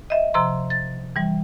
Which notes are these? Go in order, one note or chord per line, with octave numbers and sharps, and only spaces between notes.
D#5 E5
C3 F3 A#5 C6
A6
E3 G3